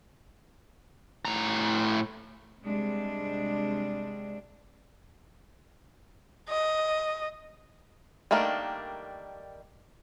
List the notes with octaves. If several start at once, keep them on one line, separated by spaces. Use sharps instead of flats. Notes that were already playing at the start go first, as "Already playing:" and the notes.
A2 A#5
C3 G3 G#3 D4
D#5
D#3 G3 A3 A#3 D4